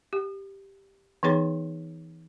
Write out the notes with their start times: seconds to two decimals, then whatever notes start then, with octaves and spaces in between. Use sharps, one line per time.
0.13 G4
1.23 E3 B3 D#4 G#4 C#5 C6